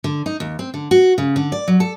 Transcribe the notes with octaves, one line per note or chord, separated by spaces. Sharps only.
D3
D#4
D#2
C4
D3
F#4
C#3
D3
D5
F#3
A4